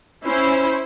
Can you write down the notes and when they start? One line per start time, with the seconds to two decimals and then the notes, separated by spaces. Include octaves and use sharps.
0.24 C#4 E4 C5